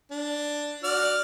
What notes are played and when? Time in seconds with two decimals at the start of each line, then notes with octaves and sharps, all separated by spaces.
0.11 D4
0.83 F#4 D5 F6